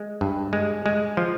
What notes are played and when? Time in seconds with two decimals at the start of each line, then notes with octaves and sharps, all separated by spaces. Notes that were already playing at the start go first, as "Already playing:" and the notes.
Already playing: G#3
0.21 G2
0.53 G#3
0.86 G#3
1.17 F3